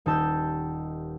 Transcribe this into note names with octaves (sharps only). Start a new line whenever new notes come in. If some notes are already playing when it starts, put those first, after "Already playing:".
D#1 D#4 G4 A5 E6 G6